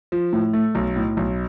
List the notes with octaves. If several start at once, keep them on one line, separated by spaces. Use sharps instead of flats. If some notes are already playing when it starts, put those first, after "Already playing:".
F3
A2
A3
B1
A2
B1